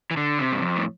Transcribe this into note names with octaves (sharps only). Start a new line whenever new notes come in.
E3
D3
C3
G2
F2
A2